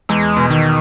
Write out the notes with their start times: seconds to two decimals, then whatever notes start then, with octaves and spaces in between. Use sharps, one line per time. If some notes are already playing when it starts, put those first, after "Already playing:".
0.09 E2 G#3
0.37 B2
0.50 D#3